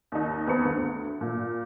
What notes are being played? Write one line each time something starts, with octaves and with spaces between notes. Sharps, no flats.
D#2 D#4
E2 C4 B4 C#7
D2
A#2